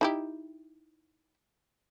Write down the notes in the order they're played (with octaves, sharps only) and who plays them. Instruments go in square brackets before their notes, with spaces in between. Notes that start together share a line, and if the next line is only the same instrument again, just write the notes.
[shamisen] D#4 E4 G4